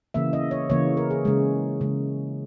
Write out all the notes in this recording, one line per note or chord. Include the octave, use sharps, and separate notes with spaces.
C#3 E3 A#3 E5
D#5
C#5
C#3 E3 A#3 C#5
A#4
G#4
C#3 G#3
C#3 G#3